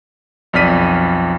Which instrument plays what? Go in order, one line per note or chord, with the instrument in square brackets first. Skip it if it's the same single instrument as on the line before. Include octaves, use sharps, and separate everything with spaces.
[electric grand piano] B1 F2 D5 F6 B6 D#7